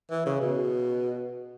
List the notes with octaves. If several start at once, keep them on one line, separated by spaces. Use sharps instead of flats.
E3
C#3
B2